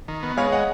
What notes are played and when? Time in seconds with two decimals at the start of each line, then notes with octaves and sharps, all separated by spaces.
0.08 D#3
0.23 B3
0.37 G#3 C#5 F5
0.52 D#5 F#5